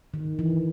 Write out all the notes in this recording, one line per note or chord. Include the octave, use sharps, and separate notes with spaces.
D#3
E3